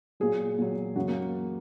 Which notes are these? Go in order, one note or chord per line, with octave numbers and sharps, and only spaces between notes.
A#2 F#3 G#4
A#2 F#3
F#2 C#3 F#3 F#4
A#3